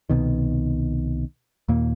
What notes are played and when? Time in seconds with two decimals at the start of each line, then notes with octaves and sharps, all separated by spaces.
0.10 C2 B2 D#3
1.68 D#2 A#2 A#3